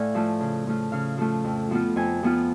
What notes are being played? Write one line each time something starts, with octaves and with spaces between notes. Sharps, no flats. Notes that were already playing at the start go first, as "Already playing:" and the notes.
Already playing: A2 D5 F5 G#5
F3 A3 F4
C#3
F3 A3 F4
C#3 F5
F3 A3 F4
F2
F3 B3 F4
F2 G#5
F3 B3 F4